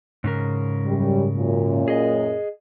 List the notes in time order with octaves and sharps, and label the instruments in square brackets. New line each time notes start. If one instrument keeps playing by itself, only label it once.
[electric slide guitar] G#2 C#3 A#4
[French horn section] F#2 G3
F#2 A#2
[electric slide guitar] G#4 D#5